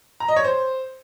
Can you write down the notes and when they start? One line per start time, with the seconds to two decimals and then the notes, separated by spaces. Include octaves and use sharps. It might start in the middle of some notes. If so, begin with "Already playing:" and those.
0.20 A#5
0.28 D#5
0.36 C#5
0.44 C5